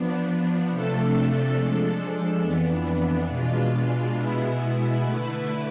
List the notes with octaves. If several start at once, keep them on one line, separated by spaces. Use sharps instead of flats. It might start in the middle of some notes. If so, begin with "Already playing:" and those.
Already playing: F3 B3 D4
C3 F3 A3 D4 A4
F3 G#3 D4 A4
F2 E3 B3 D4
B2 G#3 D4 F4
B2 G#3 B3 E4
D3 A3 E4 B4